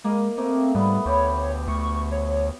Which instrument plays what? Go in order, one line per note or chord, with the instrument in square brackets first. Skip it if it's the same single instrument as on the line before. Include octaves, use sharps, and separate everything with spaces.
[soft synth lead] G#3 [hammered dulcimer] A#3 D#5 F5
[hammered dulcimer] A3 A#3 [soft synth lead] C4
[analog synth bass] G#2 [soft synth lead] G3 [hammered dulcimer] B3
[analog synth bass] D2 [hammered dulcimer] G4 B5 [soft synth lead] C#5
[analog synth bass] D2 [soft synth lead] C#6
[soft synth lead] C#5